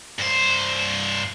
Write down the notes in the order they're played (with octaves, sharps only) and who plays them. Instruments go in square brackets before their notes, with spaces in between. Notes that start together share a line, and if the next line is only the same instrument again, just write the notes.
[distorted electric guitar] G2 C5